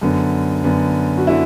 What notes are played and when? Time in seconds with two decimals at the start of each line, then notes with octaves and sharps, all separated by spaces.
0.01 F#2 D3 B3
0.64 F#2 D3 B3
1.18 F#4
1.27 D3 E4